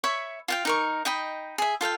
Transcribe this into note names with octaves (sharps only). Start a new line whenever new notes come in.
C#5 E5 B5 C#6
F4 F5 G5
D#4 A#4 C#6
D#4 D#5 G5 B5
G#4 E5
F4 A4 F5 G5